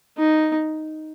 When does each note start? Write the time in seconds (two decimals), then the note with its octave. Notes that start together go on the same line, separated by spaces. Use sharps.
0.18 D#4